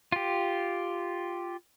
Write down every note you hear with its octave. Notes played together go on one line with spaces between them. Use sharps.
F4 G4